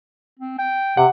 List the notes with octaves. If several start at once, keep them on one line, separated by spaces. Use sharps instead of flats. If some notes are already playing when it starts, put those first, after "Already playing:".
C4
G5
C3 F#5